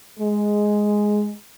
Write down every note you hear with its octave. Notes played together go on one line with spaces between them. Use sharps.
G#3